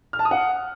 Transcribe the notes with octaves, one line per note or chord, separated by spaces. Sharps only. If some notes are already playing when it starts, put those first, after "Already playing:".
F6
A5
D#6
F#5